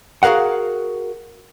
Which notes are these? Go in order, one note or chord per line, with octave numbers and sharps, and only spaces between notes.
F#4 G#4 A#4 F5 F#5